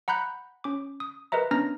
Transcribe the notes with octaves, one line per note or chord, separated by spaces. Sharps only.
F#5 A#5 B5 F#6 G6
C#4 D6
D#6
A#4 B4 D#5 E5 A#5
B3 C#4 D4 A#5 F6 A#6